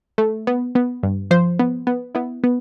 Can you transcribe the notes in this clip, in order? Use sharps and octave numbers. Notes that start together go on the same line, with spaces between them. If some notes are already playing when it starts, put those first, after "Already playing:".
A3
B3
B3
G2
F3 C5
B3
B3
B3 E4
B3